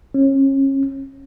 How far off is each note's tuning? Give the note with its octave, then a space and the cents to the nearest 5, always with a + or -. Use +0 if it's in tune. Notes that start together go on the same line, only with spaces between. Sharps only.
C#4 -30